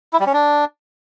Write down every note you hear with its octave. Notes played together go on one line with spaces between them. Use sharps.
E4
G3
C#4
D4